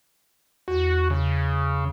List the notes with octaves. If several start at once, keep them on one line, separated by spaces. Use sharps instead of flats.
E2 F#4
C#3